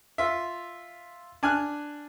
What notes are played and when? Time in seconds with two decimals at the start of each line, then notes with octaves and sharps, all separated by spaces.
0.18 F4 E5
1.43 D4 G#5 F6 F#6